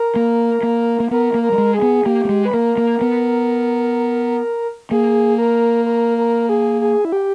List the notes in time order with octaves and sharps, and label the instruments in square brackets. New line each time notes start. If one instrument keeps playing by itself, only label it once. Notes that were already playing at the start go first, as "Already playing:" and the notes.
Already playing: [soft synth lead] A#4
[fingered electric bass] A#3
A#3
A#3
[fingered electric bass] B3 [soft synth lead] A#4
[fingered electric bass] A#3
[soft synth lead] A#4
[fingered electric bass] G3
G#3
[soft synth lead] G#4
[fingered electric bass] B3
[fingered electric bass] A#3 [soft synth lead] G4
[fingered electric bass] A#3
G#3
[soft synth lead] B4
[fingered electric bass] A#3 [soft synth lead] A#4
[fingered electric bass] A#3
B3
[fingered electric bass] A#3 [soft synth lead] G#4
[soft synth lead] A#4
A#4
A#4
G#4
G#4
E4
G4